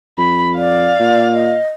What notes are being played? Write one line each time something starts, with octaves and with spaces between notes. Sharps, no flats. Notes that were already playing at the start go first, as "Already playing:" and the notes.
F2 B5
D5 F5
A#2
D#5